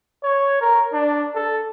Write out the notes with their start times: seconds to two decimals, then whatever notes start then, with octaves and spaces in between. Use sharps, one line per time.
0.23 C#5
0.61 A#4
0.93 D4
1.35 A4